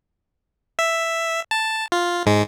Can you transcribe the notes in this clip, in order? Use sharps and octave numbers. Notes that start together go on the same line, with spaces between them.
E5
A5
F4
G#2 G#3